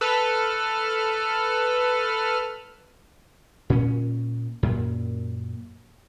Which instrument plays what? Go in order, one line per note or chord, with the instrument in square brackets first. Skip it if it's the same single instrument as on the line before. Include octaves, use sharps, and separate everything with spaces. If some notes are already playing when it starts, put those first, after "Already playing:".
[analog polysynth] A4 B4 F6
[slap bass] A#2 C#4
F#2 A#2